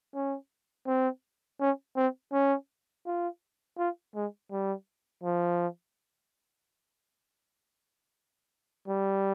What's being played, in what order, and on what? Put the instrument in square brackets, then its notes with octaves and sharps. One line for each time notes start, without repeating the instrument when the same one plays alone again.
[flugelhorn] C#4
C4
C#4
C4
C#4
F4
F4
G#3
G3
F3
G3